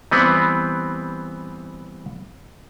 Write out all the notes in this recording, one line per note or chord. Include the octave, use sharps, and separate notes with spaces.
E3 G3 B3 C4 B4